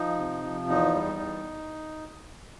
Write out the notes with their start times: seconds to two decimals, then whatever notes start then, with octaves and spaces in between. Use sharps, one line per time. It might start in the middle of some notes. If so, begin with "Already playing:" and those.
Already playing: F3 D#4
0.18 C3
0.44 F3
0.69 E2 D#4
0.94 G3
1.19 E2